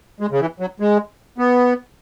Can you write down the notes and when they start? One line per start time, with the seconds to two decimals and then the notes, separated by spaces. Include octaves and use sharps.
0.20 G#3
0.31 C#3
0.40 E3
0.60 F#3
0.80 G#3
1.38 B3